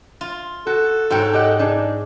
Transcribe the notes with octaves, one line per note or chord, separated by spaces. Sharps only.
F4
F#4 A4
G#2 F#4 C#5 G5
G4 D#5 F#5
D4 D#4 G#4